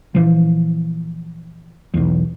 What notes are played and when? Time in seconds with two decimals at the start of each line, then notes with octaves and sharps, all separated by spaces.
0.15 A#2 E3 F3
1.94 B1 E2